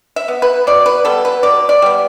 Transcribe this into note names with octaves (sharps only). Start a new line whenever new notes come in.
E5
B3
B4
B2 D5
B4
G3 B3 A4
B4
B2 D5
D5
G3 B3